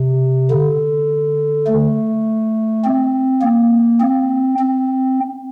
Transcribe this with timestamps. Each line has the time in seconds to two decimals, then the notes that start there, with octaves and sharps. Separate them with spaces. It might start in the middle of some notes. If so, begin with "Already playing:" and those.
Already playing: C3
0.51 D3
1.67 A3
2.84 C4
3.42 A#3
4.00 C4
4.58 C4